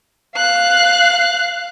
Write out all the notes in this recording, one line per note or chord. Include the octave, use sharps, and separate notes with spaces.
F5 F#6